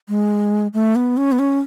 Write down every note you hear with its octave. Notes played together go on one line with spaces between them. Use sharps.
G#3
A3
B3
C#4
B3
C#4